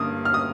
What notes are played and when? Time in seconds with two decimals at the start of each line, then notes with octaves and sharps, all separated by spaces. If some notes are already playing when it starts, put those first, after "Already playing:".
Already playing: G2 D3 A#3 D#6
0.25 F6
0.34 D#6